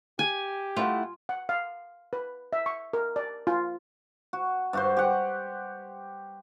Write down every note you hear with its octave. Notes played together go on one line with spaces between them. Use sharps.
G4 G#5
A3 E4 F4 F#5
F#5
F5
B4
E5
C#6
A#4
D5
F4
F#4
G2 F#4 C5
G4 F#5